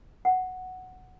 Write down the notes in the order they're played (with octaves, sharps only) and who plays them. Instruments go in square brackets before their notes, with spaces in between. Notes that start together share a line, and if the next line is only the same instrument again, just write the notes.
[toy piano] F#5